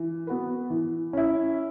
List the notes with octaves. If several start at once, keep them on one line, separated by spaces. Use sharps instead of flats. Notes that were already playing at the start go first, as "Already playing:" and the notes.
Already playing: E3
B3 F#4 B4
E3
C#4 E4